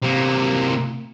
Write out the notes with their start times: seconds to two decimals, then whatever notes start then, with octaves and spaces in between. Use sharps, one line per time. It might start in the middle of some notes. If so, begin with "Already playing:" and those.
0.03 C3 A#3